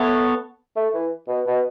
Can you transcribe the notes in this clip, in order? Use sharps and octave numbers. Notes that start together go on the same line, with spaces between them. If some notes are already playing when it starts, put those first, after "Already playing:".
Already playing: A3 B3 A4 C#5
A3
E3
B2
B2